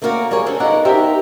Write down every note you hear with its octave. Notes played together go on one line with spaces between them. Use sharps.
A3 A#3 C#4 F#4 A#4 D5
G3 G#4 A#4 C#5
D3 C#4 F#4 A4 C5
D#4 F4 A#4 B4 D5 F#5
D#4 G4 A#4 C5 E5